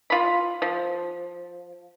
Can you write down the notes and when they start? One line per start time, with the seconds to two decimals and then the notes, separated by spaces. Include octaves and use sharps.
0.10 F4 B5
0.62 F3